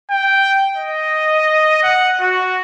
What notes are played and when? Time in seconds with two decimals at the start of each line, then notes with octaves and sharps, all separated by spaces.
0.10 G5
0.77 D#5
1.83 F#5
2.21 F#4